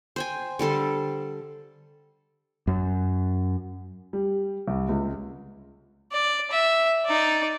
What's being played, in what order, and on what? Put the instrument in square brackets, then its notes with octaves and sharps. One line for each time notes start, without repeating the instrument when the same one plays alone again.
[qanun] C5 G5 G#5
D3 G3 A4 C6
[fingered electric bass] F#2
[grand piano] G3
C2
C#2
[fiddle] D5
E5
D#4 D5